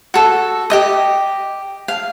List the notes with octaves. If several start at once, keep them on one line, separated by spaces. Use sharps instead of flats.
F#4 A4
G4 D#5 D#6
F5